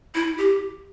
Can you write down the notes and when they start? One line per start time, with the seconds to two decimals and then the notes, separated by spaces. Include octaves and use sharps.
0.15 E4
0.38 G4